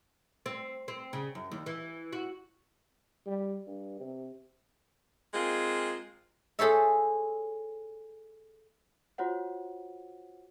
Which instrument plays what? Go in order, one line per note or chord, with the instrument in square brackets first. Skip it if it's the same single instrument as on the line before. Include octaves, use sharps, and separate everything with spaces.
[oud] C4
C4
C#3
F#2
D#2
E3
F#4
[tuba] G3
G2
C3
[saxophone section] G#3 A#3 C4 F4
[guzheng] G#4 A4 C5 C#5 E5
[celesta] F4 F#4 C5 C#5 F#5